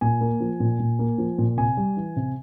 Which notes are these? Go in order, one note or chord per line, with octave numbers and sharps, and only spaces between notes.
A#2 G#5
A#3
F3
A#2
A#2
A#3
F3
A#2
C3 G#5
G3
E3
C3